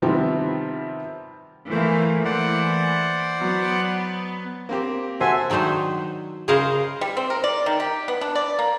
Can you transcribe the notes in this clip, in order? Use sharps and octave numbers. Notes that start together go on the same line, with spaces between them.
C3 D#3 F3 G3 B3 C4
E3 A3 A#3 C5
E3 C5 D5 F#5
F#3 B3
A#3 C4 G4
F#4 A4 C5 E5 F#5 G#5
D#3 F#3 D4 D#4 C5
C#3 G#4 A#4 C5 D#5 F5
G3
C4
A#4
D5
D#3
G4
B3
D4
D5
A#3